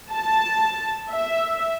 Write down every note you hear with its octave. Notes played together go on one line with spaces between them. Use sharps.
A5
E5